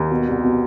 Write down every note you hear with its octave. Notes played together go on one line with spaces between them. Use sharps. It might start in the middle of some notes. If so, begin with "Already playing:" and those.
Already playing: D#2
B2
C2
B2